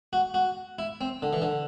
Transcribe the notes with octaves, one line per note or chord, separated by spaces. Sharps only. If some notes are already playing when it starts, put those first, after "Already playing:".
F#4
F#4
E4
C4
D3
E3
D3